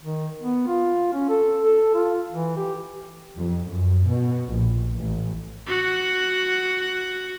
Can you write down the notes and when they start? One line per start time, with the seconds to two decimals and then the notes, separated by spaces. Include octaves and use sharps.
0.03 D#3
0.41 B3
0.67 F4
1.13 C#4
1.29 A4
1.64 A4
1.94 F4
2.32 E3
2.57 G4
3.38 F2
3.69 F#2
4.06 B2
4.52 A#1
4.94 A1
5.67 F#4 F#5